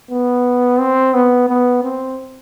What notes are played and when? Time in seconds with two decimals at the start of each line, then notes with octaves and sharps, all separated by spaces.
0.11 B3
0.79 C4
1.14 B3
1.49 B3
1.83 C4